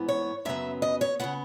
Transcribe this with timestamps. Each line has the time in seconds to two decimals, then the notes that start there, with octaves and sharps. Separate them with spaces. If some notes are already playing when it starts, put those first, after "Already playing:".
Already playing: G#2 E3 B3
0.09 C#5
0.45 F#2 C#3 F#3 B3 E5
0.82 D#5
1.01 C#5
1.20 C#3 E3 B3 F#5